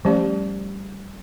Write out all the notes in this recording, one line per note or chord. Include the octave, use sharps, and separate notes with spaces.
F3 G3 A3 C#4 G4 D5